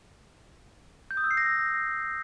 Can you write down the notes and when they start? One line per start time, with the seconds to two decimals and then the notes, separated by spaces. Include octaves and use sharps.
1.11 G6
1.17 D#6
1.24 E6
1.31 C7
1.37 A#6